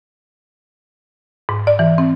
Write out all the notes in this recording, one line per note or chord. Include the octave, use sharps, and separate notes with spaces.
G#2
D5
E3
C4